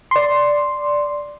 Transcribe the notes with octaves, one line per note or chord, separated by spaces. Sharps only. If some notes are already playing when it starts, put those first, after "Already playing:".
D5 C6